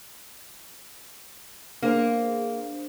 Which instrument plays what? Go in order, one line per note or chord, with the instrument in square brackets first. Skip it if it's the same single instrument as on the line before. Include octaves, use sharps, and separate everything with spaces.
[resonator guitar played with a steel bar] A#3 [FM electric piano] D4 G#4 C5